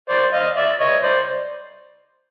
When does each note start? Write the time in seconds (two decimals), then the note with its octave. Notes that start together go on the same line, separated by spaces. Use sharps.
0.09 C5 D5
0.33 D#5 F5
0.57 D5 E5
0.80 C#5 D#5
1.03 C5 D5